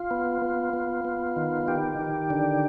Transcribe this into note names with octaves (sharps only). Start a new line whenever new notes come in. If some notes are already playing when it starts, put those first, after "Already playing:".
Already playing: F4
B3
B3
B3
B3
D#3
D#3 G4
D#3
D3